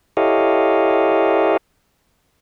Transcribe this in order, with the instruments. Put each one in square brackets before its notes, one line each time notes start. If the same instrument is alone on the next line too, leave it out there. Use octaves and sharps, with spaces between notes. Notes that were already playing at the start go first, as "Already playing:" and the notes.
[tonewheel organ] E4 G4 A4 C#5 D#5 F5